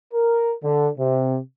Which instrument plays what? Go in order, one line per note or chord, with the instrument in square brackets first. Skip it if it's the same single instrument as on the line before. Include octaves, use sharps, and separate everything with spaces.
[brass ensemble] A#4
D3
C3